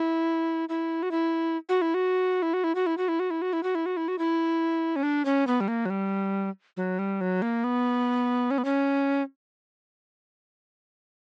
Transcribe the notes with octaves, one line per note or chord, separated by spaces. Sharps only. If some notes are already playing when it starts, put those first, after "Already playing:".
Already playing: E4
E4
F#4
E4
F#4
E4
F#4
E4
F#4
E4
F#4
E4
F#4
E4
F#4
E4
F#4
E4
F#4
E4
F#4
E4
F#4
E4
C#4
D4
C#4
B3
G3
A#3
F#3
G3
F#3
G3
F#3
A#3
B3
C#4
B3
C#4